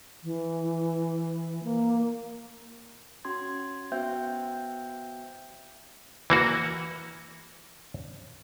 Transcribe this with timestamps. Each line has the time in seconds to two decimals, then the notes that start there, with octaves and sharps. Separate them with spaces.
0.24 E3
1.63 A#3
3.25 C#4 F#4 C6 G#6
3.92 B3 F#4 C5 E5 G5 G6
6.30 E3 A#3 F#4